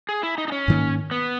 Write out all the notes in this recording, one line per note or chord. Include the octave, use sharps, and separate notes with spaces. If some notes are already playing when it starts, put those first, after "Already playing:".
G#4
E4
D#4
D#4
C#4
G#2 D#3 A#3
B3